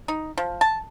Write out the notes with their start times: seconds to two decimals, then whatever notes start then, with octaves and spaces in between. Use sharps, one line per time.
0.08 D#4
0.37 F3
0.61 A5